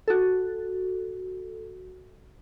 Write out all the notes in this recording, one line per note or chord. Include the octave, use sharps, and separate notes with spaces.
F#4 A4